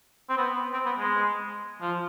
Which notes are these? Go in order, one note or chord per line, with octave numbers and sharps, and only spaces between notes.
C4
B3
C4
B3
G#3
F3